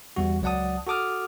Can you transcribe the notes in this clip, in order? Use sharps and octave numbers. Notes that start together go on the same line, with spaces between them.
E2 G3 F#4
C#2 F#3 D5 F#5 A5 D#6
F#4 A4 A5 D6 D#6 F6